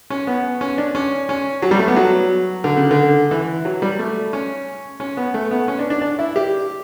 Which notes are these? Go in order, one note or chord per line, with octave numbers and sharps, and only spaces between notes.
C#4
B3
C#4
D4
C#4
C#4
F#3
G3
A3
B3
F#3
D3
C#3
D3
E3
F#3
G3
A3
C#4
C#4
B3
A3
B3
C#4
D4
D4
D4
E4
G4